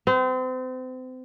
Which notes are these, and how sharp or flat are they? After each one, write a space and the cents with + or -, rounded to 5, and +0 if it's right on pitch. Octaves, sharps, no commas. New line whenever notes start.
C4 -35